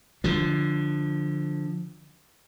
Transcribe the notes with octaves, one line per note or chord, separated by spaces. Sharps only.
D3 F3